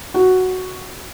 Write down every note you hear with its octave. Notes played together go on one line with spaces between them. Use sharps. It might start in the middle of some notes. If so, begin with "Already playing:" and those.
F#4